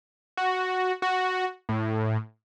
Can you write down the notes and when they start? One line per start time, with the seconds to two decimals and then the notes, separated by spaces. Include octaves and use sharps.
0.37 F#4
1.02 F#4
1.69 A2